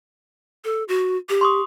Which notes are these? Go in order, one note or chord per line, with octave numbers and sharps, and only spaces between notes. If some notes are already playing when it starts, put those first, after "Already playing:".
A4
F#4
G4
C6 C#6 D#6